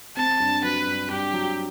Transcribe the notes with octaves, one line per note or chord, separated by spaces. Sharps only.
C4 A5
G2
F#3 B4
G2
G2 G4
F#3